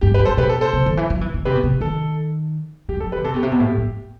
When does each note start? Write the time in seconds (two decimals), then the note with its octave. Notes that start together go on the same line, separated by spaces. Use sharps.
0.01 G2 G4
0.14 G4 B4
0.19 G2
0.25 A4 C5
0.37 B2 G4 B4
0.49 A4
0.61 A4 C5
0.73 C3
0.86 D#3
0.97 E3
1.10 F#3
1.21 E3
1.34 D#3
1.45 C3 G4 B4
1.55 B2
1.63 C3
1.81 D#3 A4
2.89 E3 G4
2.97 F#3
3.00 A4
3.12 G4 B4
3.16 D#3
3.24 C3 A4
3.34 B2 G4
3.43 C3
3.48 G4
3.52 B2
3.60 A2 G4
3.78 G2